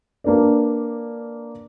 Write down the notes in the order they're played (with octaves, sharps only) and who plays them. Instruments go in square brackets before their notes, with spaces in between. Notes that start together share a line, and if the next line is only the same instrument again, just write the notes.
[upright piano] A#3 D4 B4 D5